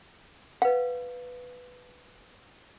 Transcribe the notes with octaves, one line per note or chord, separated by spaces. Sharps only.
B4 F5 F#5